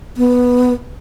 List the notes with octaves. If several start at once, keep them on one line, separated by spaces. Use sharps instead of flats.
B3